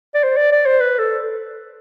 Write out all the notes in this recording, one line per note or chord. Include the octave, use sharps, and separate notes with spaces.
D5
C5
D5
D5
C5
B4
A4